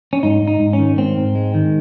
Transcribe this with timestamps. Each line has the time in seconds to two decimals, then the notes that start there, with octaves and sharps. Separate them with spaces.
0.13 C#4
0.23 G#2 D#4
0.42 G#2
0.47 D#4
0.60 G#2
0.73 C#4
0.79 D#3
0.98 G#2 C4
1.18 G#2
1.35 G#3
1.54 D#3